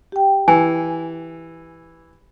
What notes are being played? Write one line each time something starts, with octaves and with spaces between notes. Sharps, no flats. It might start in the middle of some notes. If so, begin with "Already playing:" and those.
G4 G5
E3 G#5